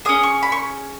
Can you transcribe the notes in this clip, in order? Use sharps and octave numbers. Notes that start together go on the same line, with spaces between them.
C#4 G#4 D#6
C#6
B5
C#6